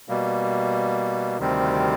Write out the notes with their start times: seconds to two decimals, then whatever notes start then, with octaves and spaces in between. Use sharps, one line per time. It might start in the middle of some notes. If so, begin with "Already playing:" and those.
0.08 B2 G3 A#3
1.39 D2 C3 D#3 G3 C4